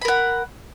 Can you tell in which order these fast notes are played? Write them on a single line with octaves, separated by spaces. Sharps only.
B5 A#4 F#5